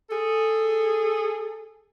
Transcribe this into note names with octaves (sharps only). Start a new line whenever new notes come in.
G#4 A4